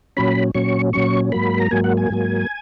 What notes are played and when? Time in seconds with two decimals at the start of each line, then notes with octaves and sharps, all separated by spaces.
0.17 A#2 F#3 C#4 B5
0.55 A#2 F#3 C#4 C#6
0.93 A#2 F#3 C#4 C#6
1.32 G#2 F#3 A#3 B5
1.60 A#5
1.71 G#2 F#3 A#3 G#5
1.84 F#5
1.97 G#5
2.10 G#2 F#3 A#3